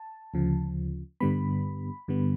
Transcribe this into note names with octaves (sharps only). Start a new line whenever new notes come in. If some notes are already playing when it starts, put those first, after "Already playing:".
Already playing: A5
D2 C#3 F3
G2 D3 G3 B3 B5
G2 D3 G3 B3